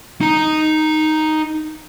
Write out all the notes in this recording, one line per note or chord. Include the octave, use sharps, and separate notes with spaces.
D#4 A#5